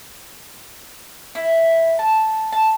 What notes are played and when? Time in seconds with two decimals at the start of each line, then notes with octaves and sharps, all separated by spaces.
1.35 E4
1.99 A5
2.53 A5